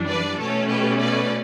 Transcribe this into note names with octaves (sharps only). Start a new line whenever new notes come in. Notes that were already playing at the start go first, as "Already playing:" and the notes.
Already playing: F#2 E3 G3 D4
B4 D5
B2 A3 C#4 A4 C#5
G4 B4
B4 D5